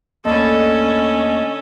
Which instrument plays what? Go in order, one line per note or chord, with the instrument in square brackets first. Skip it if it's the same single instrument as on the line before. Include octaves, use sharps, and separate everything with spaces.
[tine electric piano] D#2 A3 A#3 [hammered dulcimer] D3 B5 [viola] C#4 A4 [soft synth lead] D#5